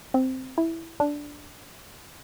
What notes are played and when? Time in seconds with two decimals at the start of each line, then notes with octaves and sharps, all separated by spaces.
0.14 C4
0.58 E4
1.00 D4